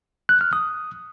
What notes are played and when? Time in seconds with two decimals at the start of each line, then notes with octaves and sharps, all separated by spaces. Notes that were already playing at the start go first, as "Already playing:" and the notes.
0.29 F#6
0.41 F6
0.53 D#6